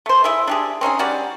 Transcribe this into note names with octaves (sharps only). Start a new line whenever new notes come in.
A3 C5
E4 G#4 E5
D4 G4 G#4
C4 C#4 D#4 G#4
G3 C#4 F#4 D5